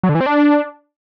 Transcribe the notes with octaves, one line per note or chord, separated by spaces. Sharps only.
F#3
D3
E3
C4
D4